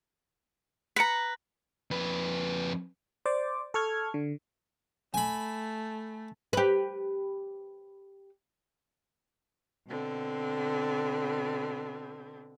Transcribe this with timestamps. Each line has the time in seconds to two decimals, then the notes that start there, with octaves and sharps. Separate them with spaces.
0.96 B4 A#5 B6 C#7
1.91 F2 B4
3.25 C5 D5 D6
3.74 A4 C#6 F6 G#6
4.14 D3
5.14 A3 G#5 B5
6.53 G4 B4
9.88 B2 D3 C4